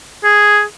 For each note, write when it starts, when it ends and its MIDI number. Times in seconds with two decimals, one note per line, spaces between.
0.24 0.62 68